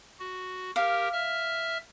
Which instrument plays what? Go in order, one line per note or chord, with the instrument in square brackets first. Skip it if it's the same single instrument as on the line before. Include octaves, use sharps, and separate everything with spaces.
[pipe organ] F#4
[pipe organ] G4 A#4 [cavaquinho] F5
[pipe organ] E5 F6